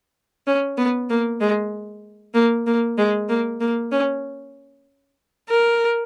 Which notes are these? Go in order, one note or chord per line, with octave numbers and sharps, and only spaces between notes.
C#4
B3
A#3
G#3
A#3
A#3
G#3
A#3
A#3
C#4
A#4